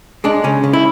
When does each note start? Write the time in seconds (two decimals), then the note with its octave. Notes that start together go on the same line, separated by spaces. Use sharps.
0.24 G#3 D4
0.44 C#3 C#4
0.64 C#3
0.73 E4